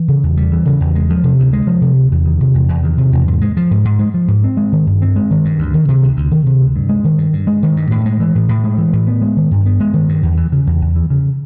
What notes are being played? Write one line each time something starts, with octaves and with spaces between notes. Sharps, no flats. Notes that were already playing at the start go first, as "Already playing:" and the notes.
Already playing: E3
C#3
E2
G3
E3
C#3
E2
G#3
F3
C3
D2
G#3
F3
C3
D2
E2
D#3
C3
E2
E2
D#3
C3
E2
G#2
G#3
F3
G#2
G#2
G#3
F3
G#2
C4
G#3
D#3
G2
C4
G#3
D#3
G2
D2
D#3
C3
D2
D2
D#3
C3
D2
G2
G#3
D#3
G2
G2
G#3
D#3
G2
A2
G#3
E3
A2
A2
G#3
E3
A2
B3
G#3
D#3
G2
B3
G#3
D#3
G2
E2
E3
C#3
E2
E2
E3
C#3